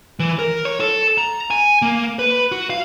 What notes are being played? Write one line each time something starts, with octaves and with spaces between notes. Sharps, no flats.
E3
A#4
C#5
A4
A#5
G#5
A#3
B4
F#4
F5